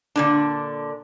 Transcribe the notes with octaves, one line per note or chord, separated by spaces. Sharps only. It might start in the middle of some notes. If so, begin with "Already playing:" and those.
A#2 D3 D4